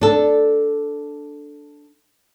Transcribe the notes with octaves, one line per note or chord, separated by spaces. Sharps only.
D4 A4